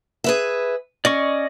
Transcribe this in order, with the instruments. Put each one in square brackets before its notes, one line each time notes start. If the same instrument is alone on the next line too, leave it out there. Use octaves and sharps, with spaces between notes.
[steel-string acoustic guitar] G#4 B4 E5
[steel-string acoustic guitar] C#4 [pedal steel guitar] D5 D#5 C#6